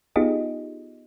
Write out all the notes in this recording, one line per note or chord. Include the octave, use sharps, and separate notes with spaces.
B3 D#4 F4 G4 G#4 D#5